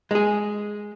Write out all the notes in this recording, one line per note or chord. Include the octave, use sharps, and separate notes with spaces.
G#3 G#4